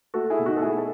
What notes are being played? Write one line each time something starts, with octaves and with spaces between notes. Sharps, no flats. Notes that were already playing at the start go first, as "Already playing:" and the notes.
A3 F#4 A4
E4 G#4
B2
D#4 F#4
A4
A3 E4 G#4
A4